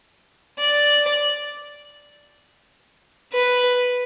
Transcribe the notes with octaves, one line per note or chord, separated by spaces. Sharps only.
D5
B4